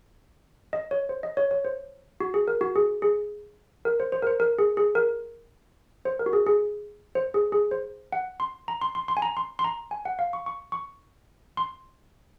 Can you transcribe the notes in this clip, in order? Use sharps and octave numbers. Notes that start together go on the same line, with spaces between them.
D#5
C#5
C5
D#5
C#5
C#5
C5
F#4
G#4
A#4
F#4
G#4
G#4
A#4
C5
C5
A#4
C5
A#4
G#4
G#4
A#4
C5
A#4
F#4
G#4
G#4
C5
G#4
G#4
C5
F#5
C6
A#5
C6
C6
C6
G#5
A#5
C6
C6
A#5
G#5
F#5
F5
C#6
C#6
C#6
C6